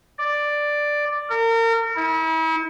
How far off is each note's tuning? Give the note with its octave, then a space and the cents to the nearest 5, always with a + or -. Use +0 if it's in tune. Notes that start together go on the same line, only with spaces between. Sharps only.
D5 +5
A#4 -35
E4 -40